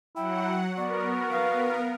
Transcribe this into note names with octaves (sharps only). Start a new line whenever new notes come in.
F#3 E4 F#5 G5
B3 F#4 A#4 D5
B4 F5